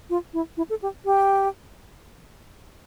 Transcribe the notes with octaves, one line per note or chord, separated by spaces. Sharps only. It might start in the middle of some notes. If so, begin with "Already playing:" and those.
F4
E4
E4
A4
G4
G4